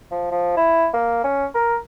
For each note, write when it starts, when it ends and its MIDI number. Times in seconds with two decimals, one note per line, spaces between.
0.11 0.30 53
0.31 0.52 53
0.57 0.88 64
0.93 1.22 58
1.24 1.46 61
1.55 1.76 70